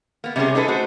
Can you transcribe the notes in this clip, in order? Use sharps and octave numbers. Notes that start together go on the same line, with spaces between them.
A#3 B3
C3 G3 B3 C#4 G#4
D#4 G#4 A4 B4
A3 F#4 C5